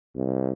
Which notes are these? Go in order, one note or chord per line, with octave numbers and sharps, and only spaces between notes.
C2